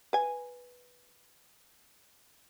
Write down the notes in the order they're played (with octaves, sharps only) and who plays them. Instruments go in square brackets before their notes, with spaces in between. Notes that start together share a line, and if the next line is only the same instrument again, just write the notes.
[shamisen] B4 G#5